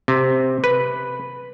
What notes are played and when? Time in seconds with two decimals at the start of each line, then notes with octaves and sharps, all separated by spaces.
0.08 C3
0.64 B4